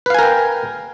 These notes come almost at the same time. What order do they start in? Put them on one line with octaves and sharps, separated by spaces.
B4 F5 G#5 A#4 G5